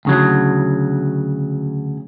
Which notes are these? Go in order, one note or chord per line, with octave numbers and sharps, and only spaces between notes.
D2 C#3 F#3